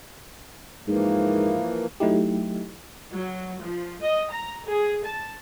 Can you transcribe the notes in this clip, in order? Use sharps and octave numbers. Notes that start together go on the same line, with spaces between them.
G#2 E3 F3 A#3
F#3 A3 D#4 E4 G4
F#3
F3
D#5
A#5
G#4
A5